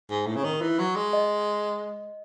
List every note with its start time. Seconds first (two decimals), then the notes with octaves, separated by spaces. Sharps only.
0.10 G#2
0.27 A2
0.36 C#3
0.44 D#3
0.61 E3
0.79 F#3
0.96 G#3
1.13 D#5